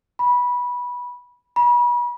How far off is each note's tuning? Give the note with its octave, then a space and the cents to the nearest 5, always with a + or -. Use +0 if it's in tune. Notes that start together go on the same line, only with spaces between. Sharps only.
B5 -15
B5 -35